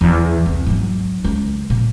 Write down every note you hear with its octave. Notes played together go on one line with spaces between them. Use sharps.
E2
C2
G#2 F#3
C#2
A#2